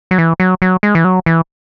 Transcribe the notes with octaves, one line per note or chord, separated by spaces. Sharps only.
F#3
E3
F#3
F#3
G#3
E3
F#3
E3